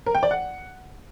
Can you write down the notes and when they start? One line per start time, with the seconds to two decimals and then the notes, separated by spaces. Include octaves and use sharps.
0.06 A#4
0.15 G5
0.23 D5
0.31 F#5